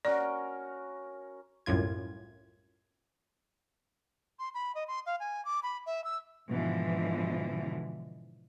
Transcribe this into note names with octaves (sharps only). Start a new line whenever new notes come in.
C#4 F#4 A#4 D5
C2 F#2 A2 F4 G#6
C6
B5
D#5
C6
F5
G#5
D6
B5
E5
E6
G#2 B2 D3 E3 F3